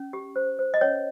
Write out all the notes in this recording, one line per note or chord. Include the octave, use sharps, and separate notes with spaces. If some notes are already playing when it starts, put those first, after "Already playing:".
Already playing: C#4
G4
C5
C5
D#5
C#4 C#5